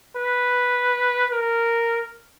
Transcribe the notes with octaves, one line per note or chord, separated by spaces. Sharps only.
B4
A#4